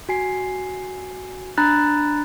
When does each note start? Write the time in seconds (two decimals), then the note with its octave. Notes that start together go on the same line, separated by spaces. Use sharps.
0.09 F#4 G#5 C7
1.58 D4 A#5 B5 F#6 A6